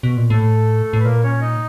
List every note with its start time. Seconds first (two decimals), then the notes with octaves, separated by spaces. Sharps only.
0.03 B2
0.17 A#2
0.30 A2 A3 A4
0.93 A2
0.99 B4
1.04 A#2 A#3 A#4
1.23 C#4 C#5
1.41 D#4 D#5